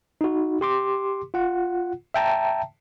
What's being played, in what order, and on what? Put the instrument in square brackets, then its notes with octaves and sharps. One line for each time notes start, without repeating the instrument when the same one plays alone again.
[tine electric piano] D#4 F#4
G4 C6 D6
F4 F#5
E5 G5 A5 A#5